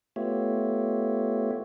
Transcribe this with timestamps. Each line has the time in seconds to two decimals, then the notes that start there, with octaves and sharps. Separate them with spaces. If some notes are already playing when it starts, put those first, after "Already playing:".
0.16 A3 B3 F4 G4 C#5 E5